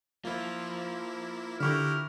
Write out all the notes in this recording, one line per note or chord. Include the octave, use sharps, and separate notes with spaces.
A#3 E4 F4 C5
D3 E4 G4 A#4 C#6 F6 F#6